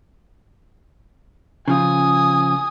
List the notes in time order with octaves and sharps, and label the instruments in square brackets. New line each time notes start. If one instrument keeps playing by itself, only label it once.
[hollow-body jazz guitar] C#3 F3 F4 [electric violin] G#5 D#6